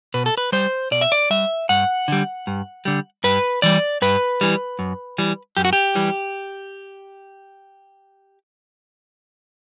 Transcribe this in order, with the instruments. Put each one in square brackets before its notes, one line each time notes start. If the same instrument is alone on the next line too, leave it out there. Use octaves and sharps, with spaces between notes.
[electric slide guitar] B2 B4
A4
B4
G3 C5
B2 D5
E5
D5
G3 E5
G2 F#5
D3 G3
G2
D3 G3
G2 B4
E3 G3 D5
G2 B4
E3 G3
F#2
E3 G3
F#2 G4
F#4
G4
E3 G3